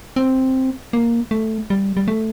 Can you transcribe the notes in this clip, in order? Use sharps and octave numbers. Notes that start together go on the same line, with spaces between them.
C4
A#3
A3
G3
G3
A3